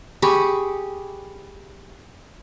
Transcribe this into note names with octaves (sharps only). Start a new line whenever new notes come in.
G4 G#4 B5 C#6